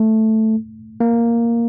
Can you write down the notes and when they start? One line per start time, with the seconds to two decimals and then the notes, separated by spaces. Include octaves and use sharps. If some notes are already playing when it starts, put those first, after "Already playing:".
Already playing: A3
1.00 A#3